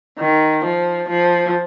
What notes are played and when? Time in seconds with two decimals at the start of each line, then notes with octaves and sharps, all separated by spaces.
0.19 D#3
0.64 F3
1.09 F3